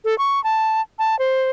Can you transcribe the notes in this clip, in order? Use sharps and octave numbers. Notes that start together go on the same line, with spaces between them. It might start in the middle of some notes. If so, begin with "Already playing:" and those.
A4
C#6
A5
A5
C5